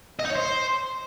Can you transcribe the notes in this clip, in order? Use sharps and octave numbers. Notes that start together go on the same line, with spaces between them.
D#5
D#4
C#5
C5